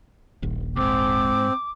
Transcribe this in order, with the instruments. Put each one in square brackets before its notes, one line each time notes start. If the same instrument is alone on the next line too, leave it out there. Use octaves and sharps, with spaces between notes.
[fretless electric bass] D#1 A#1 D#2
[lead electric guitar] D2 G#2 [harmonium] C4 [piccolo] D6